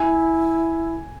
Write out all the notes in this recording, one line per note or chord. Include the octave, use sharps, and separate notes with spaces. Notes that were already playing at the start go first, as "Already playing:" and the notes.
Already playing: E4 G#5